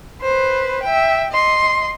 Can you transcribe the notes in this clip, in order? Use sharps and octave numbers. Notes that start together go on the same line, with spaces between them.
B4 C5
E5 G5
D#5 C6